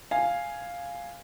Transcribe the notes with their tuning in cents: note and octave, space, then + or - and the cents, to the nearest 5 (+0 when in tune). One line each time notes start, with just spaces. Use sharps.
F5 +0 G#5 +0